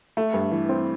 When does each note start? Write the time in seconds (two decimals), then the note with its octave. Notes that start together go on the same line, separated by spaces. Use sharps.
0.17 A3
0.34 G2
0.51 E3
0.69 C4